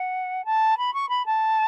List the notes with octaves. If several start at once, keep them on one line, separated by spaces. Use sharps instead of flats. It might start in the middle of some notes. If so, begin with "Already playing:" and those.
Already playing: F#5
A5
B5
C#6
B5
A5